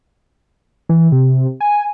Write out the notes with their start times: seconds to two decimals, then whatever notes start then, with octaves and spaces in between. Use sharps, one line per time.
0.89 E3
1.12 C3
1.60 G#5